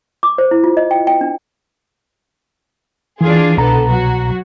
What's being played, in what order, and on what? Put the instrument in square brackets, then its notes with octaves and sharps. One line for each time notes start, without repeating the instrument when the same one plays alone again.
[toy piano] D6
C5
E4
F4
D#5
G5
G5
D4
[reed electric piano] E3 [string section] D4 F4 G#4
[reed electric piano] C2 B2 A#5 [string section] D3 B3 A4
[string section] F#3 F#4